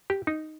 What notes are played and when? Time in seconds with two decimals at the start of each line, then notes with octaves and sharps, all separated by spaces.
0.10 G4
0.27 D#4